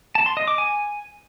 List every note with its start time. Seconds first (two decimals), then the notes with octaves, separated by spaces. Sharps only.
0.15 A5
0.26 C6
0.37 D#5
0.48 D6
0.58 G#5